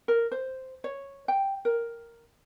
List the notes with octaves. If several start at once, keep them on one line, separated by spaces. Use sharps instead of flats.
A#4
C5
C#5
G5
A#4